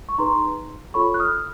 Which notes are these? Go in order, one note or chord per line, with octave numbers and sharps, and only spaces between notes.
C#6
D#4 G#4 B4 A#5 C6
F4 A4 C#5 B5 C#6
F#6
D#6 F6